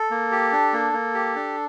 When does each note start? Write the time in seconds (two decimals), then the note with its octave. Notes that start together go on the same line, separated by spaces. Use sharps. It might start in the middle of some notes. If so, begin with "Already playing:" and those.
Already playing: A4
0.11 A#3
0.32 G4
0.52 D4
0.73 A#3
0.93 A#3
1.14 G4
1.35 D4